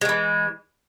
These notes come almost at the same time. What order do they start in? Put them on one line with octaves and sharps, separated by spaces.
G#3 D#3 E3